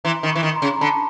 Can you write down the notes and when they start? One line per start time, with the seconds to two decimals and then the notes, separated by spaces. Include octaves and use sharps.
0.05 E3 A#5 C6
0.23 D#3
0.30 B5 C#6
0.35 E3
0.43 D#3
0.55 A#5 C6
0.62 C#3
0.76 A#5
0.81 D3 A5 B5